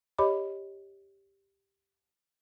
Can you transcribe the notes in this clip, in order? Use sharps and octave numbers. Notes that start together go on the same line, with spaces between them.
G4 C#5 D#5 B5 D6